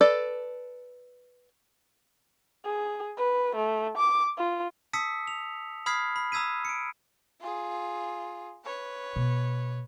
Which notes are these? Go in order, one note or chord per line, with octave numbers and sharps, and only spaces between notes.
A4 B4 D5
G#4
B4
A3
D6
F4
A5 D#6 E6 B6 C#7
F7
B5 D#6 F6 G#6 B6 C7
B5
A#5 D#6 E6 G#6 B6 D#7
C#7 D7
F4 G#4
B4 C#5
B2